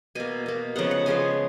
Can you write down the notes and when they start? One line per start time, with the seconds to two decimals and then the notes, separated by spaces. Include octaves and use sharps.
0.15 B2 A#3 G#5
0.46 B2 A#3
0.75 C#3 F3 G#3 B3 F#5
0.91 F#5
1.06 C#3 F3 G#3 B3 G#5